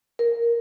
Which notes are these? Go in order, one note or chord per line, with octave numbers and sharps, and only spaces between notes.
A#4